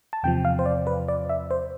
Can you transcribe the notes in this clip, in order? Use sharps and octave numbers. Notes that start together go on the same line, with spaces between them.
A5
E2 C3 F3 G5
F5
C5
D5
B4
D5
E5
C5